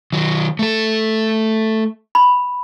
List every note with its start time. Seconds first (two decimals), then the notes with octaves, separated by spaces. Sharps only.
0.13 D#3 F#3
0.59 A3 A4
2.15 B5